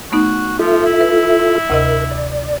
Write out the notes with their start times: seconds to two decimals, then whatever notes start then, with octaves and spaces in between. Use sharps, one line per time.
0.12 A3 B3 D#4 F#4
0.59 F3 F4 A4 E5
0.85 E4
1.01 B4
1.70 D2 C3 A#4 D#5
2.11 D5